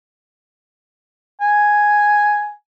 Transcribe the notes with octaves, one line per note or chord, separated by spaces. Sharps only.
G#5